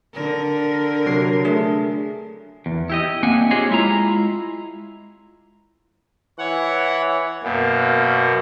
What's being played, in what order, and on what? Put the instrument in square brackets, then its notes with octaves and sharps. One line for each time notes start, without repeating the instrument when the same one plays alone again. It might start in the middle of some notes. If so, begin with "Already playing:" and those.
[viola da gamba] D3 A#4
[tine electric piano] C3 F#3 C7
A3 D4 G#4
[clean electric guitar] E2
E4 G4 D#5
A#3 C4 D4 F#5 G#5
F4 G4 G#4 C5 C#5 D#5
G#3 E4 F4 A#5
[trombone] E3 [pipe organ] C#5 F#5
[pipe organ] F#2 B2 [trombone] A#3